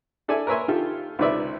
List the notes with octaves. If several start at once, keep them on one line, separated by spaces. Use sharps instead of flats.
E4 A4 D5 E5 G#5
A#4 B4 C#5 E5 G#5 C6
D#3 F4 G4 A4
C#2 C3 D#3 B4 D5 E5